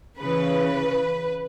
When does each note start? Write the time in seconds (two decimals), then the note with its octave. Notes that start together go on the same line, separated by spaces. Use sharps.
0.20 C#3 E3 B4